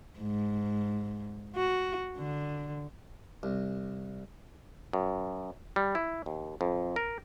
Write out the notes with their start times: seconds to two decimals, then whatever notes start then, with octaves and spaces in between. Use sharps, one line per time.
0.19 G#2
1.56 F#4
2.17 D3
3.43 C2
4.93 F#2
5.76 G3
5.95 E4
6.26 D#2
6.61 F2
6.96 A#4